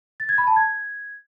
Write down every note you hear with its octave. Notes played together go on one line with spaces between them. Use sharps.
A6
G#6
B5
A5
G#6